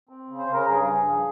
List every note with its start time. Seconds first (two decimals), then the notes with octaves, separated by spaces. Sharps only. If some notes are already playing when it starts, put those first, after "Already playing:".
0.09 C4
0.29 C#3
0.39 C5
0.48 C#3 A#4
0.67 G2 G#4
0.86 G2
1.04 F3